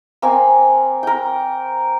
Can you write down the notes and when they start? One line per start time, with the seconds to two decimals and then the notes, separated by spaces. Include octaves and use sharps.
0.22 A#3 C4 G#5
1.03 A#4 G5